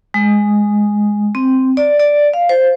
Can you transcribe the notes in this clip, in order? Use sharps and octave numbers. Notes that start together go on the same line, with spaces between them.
G#3
C4
D5
D5
F5
C5